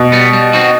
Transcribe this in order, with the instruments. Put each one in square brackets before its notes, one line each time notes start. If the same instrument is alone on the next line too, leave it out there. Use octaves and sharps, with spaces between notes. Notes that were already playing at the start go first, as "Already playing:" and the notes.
Already playing: [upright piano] B2
[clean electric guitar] G3 B3
G3
C4 D#4 F#4